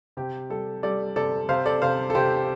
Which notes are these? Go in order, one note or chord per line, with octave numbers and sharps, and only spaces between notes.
C3 G4
G3 A4
G3 A4 D5
C3 A4 D5
C3 C5 F5
A4 D5
C3 C5 F5
A4
C3 G4 C5